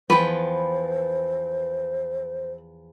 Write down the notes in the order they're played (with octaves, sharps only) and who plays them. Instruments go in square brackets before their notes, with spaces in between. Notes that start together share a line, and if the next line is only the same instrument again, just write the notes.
[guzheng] E2 F3 G5 [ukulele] B4 [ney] C5